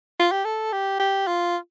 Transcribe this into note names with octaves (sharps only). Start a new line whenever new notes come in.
F4
G4
A4
G4
G4
F4